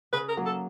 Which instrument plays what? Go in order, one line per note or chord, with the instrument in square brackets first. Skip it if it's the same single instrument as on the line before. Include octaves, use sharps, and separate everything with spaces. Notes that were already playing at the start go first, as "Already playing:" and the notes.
[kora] C#3 [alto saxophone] B4
[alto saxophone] A#4
[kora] F#3 A#3
[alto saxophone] A4